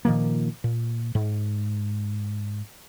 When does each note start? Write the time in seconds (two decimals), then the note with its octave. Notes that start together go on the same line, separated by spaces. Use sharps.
0.05 A#2 D#3 F3 A#3
0.64 A#2
1.15 G#2